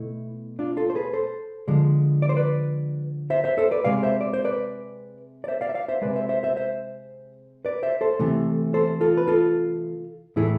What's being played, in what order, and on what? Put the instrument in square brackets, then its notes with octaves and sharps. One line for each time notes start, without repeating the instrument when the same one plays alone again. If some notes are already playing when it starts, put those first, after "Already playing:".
Already playing: [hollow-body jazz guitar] B2 A3 E4
D4 F4
F4 A4
C5
G#4 B4
A4 C5
D3 F3 G#3
D5
C5
B4 D5
C5 E5
C5 E5
A4 C5
B4 D5
C3 G#3 D5 F5
C5 E5
D5
C5
B4 D5
D5
C5 E5
D5 F5
E5
D5 F5
C5 E5
C3 G#3 B4 D5
C5 E5
C5 E5
C5 E5
C5 E5
B4 D5
C5 E5
A4 C5
C3 E3 A3
A4 C5
F4 A4
B4
F4 A4
A2 E3 A3 E4 G#4